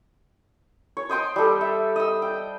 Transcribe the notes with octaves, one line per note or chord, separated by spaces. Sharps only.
C#5
C5 D#5 G5 C6
G3 A4
E5
D#5 E6
G5